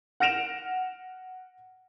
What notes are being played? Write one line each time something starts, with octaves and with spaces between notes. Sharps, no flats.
F#5 F6 A#6 D7 E7 F7